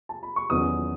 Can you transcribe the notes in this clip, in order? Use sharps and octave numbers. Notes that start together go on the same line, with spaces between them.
A5
B5
C#6
E2 D#3 F#3 C#4 D#6